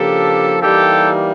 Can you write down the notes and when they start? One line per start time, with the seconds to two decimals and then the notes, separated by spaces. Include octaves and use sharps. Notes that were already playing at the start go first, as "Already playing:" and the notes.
Already playing: C#3 F3 A#3 D4 G4 A4
0.61 E3 G3 A#3 D#4 G4 A4